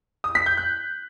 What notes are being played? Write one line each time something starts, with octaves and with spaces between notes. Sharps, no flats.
D#6
B6
G6
F#6